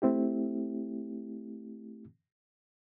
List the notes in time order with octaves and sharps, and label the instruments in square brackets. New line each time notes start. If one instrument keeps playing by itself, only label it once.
[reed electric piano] A3 C4 E4 G4